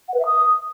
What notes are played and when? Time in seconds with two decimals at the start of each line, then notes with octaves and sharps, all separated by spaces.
0.08 F#5
0.14 B4
0.19 E5
0.25 D#6